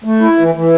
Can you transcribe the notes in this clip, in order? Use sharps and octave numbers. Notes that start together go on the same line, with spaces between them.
A3
E4
E3
E3